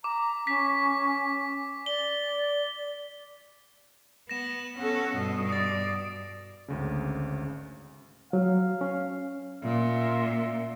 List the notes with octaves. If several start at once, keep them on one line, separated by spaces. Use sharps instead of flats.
A#5 D6
C#4 B6
D5 G7
B3 A#6 E7
B3 C#4 A4 F#5
G2 B2 D#5
D5 D#6 A6
G#1 D2 C#3
F#3 F5
C#4
A#2 E5